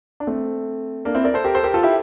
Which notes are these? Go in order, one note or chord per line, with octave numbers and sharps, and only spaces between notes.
D4
A3 C4
A#3 D4
C4 E4
A#4 D5
A4 C5
G4 A#4
A4 C5
G4 A#4
F4 A4
E4 G4